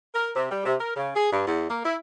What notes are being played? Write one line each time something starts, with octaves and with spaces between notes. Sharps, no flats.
A#4
C3
G3
C3
A#4
C#3
G#4
G2
E2
A#3
E4